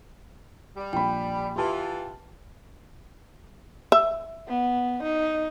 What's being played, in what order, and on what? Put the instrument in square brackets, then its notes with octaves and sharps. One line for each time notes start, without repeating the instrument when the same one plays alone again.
[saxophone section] G3
[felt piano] A#1 B5 [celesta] G5
[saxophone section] E3 F4 [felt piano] G4 A5
[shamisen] E5
[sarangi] B3
D#4